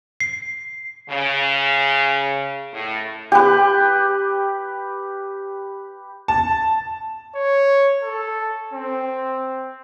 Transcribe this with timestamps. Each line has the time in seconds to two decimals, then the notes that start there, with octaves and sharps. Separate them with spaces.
0.20 C7
1.10 C#3
2.74 A2
3.32 G4 B4
6.28 A5
7.35 C#5
8.03 A4
8.74 C4